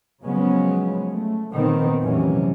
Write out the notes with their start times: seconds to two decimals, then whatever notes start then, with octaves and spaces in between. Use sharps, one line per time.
0.24 C#3 F3 F#3 G#3 B3 C#4
1.10 A3
1.53 A#1 D#3 B3 C4
2.00 F1 C3 E3 F#3 C#4